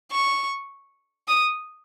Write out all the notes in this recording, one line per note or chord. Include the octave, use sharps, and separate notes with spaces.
C#6
D#6